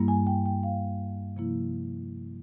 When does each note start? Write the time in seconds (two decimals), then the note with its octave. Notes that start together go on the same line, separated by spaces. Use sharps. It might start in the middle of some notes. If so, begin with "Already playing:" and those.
Already playing: G2 G3 A#3 E4
0.08 G#5
0.27 G5
0.46 G5
0.63 F5
1.36 C3 F3 A#3 E4